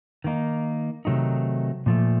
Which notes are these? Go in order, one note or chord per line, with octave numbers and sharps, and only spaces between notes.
D#3 A#3 D#4
C3 D#3 F#3 A3 D#4
A#2 F3 A3